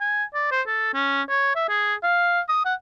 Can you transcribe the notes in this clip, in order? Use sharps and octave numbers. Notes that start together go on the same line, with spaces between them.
G#5
D5
C5
A4
C#4
C#5
E5
G#4
F5
D#6
F#5